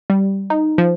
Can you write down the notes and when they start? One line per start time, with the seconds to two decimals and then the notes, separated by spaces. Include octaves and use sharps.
0.10 G3
0.50 D#4
0.78 F3